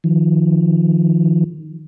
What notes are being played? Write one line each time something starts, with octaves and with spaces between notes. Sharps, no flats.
D#3 F3